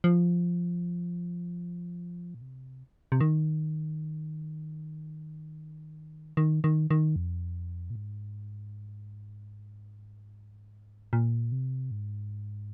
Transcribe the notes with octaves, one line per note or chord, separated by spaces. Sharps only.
F3
A#2
C3
C3
D#3
D#3
D#3
D#3
F2
A#2
G#2
A#2
C3
G#2